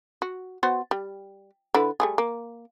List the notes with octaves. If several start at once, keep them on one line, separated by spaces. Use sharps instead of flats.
F#4
B3 F#4 C5
G3
D3 E4 B4
G3 A3 G#4
A#3